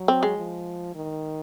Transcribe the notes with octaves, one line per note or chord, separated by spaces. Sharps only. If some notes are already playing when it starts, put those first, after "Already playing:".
Already playing: F#3
C4
G#3
F3
D#3